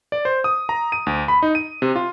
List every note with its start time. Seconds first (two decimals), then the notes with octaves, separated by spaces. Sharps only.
0.12 D5
0.25 C5
0.44 D#6
0.69 A#5
0.92 D#7
1.06 D2
1.28 B5
1.43 D#4
1.55 D#7
1.82 C3
1.95 F4